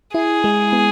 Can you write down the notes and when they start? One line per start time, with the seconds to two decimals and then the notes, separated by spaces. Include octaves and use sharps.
0.14 E4 G#4
0.44 G#3
0.73 B3